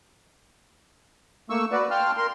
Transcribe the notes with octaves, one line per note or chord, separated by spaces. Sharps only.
A3 A#3 C#6 E6
F#4 B4 D5
F5 G5 A5 C6 F6
A#4 C6